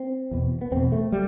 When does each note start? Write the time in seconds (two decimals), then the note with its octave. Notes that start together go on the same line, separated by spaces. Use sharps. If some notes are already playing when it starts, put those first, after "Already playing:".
Already playing: C4
0.31 E2 B2
0.61 B3
0.71 E2 B2 C4
0.92 A3
1.12 G3